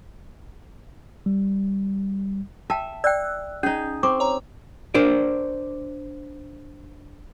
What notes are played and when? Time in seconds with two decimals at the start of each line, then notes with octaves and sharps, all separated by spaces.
1.26 G3
2.70 E5 G5 A5
3.04 D5 G5 E6 F#6
3.63 C#4 D#4 G#4 G6
4.03 C4 C#6 D6
4.20 C#5 A#5
4.94 D4 A#4 C5 D5